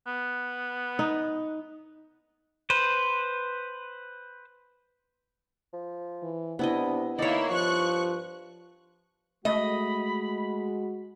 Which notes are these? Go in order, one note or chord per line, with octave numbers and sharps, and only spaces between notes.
B3
D#4
B4 C5
F3
E3
C3 B3 D4 E4 D#5
D#3 A#3 D#4 E4 C#5 D5
G2 F3 C#6 F#6
G#3 A3 F#4 D#5 B5